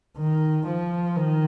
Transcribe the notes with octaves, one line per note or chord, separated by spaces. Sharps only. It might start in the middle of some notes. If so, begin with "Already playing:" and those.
D#3
F3
D#3